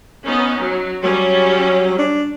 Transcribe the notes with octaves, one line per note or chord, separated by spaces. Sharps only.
B3 C#4 D#4
F#3
F#3 G3 C#4
D4